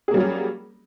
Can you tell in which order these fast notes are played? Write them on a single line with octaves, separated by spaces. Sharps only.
G#4 A#3 G3 F#3 C#4